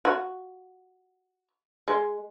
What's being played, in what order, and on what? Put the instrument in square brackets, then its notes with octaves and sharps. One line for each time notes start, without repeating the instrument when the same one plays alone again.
[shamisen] F#4
G#3